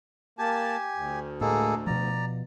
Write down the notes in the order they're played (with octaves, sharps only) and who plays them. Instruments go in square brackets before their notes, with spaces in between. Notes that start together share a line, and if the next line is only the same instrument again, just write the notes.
[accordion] A#3 A5 [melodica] G4 G#5
[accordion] D2
[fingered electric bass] A2 [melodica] G#3 A#3 A4
[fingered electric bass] B2 F3 [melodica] D5 A#5